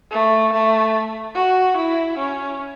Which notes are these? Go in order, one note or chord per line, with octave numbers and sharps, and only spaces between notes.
A3
A3
F#4
E4
C#4